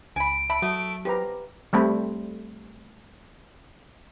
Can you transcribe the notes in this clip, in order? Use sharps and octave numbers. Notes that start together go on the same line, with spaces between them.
C#2 G#5 B5 D7
E5 A5 B5
F#3 A3 E5 D#6
F3 G4 B4 A#5
G3 A3 C4 B5